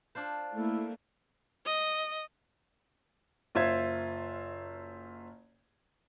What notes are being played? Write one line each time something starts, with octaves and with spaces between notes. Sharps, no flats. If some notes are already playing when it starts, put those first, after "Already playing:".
D4 F4 C5
A3 A#3 E4
D#5
F#1 F4 C5 E5 G#6